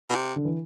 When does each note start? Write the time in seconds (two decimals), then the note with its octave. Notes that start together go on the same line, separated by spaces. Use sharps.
0.10 B2
0.15 C3
0.36 D3
0.45 E3